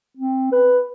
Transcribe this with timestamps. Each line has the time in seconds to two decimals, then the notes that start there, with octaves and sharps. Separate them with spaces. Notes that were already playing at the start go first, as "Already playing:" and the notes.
0.17 C4
0.52 B4